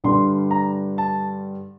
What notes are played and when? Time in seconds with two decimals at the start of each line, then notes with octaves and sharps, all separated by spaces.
0.04 G2 D3 G3 D4 C6
0.51 A#5
0.98 A5